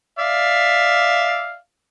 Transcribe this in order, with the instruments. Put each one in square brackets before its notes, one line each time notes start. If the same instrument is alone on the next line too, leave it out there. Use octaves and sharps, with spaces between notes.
[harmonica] D5 E5 F5